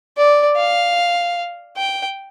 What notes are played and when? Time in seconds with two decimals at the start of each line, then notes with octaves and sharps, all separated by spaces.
0.17 D5
0.57 F5
1.77 G5